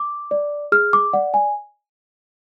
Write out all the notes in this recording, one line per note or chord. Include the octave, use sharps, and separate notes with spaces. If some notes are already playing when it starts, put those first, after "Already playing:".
Already playing: D6
D5
G#4 F6
D6
D5 F#5
G#5